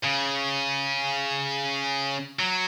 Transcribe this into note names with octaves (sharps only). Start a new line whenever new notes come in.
C#3
F#3